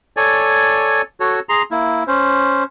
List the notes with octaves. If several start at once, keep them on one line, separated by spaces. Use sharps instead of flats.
A4 C#5 D5 G#5
F#4 A4 C#5
G#4 A#5 C6
A#3 E4
C#4 C5